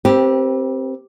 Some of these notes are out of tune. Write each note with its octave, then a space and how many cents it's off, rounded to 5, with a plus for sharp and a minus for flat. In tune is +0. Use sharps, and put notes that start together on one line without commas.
C4 +10 G4 +0 B4 -35